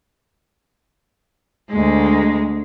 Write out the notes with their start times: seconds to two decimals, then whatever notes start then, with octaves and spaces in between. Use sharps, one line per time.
1.71 D2 G#3